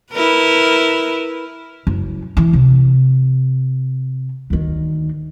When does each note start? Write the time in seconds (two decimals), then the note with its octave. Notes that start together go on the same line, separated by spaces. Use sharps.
0.12 E4 A#4 B4
1.87 F#1
2.37 E3
2.53 C3
4.50 D2 D#3